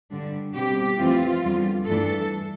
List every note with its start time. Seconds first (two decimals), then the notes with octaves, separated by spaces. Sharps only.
0.10 G2 D3 G3 D4
0.54 B2 G3 C4 G4
0.98 F2 E3 A3 C4 F4
1.44 E2 D3 G3
1.87 G2 E3 A3 D4 A4